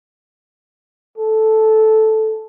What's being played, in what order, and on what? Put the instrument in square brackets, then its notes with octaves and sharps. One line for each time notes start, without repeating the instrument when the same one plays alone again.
[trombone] A4